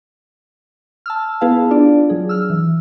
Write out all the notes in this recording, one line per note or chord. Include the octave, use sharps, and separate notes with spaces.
A5 E6 F6
B3 E4 G#4 B4 F5 A5
D4 F4 D5
F#3 G#4
E6 F6
E3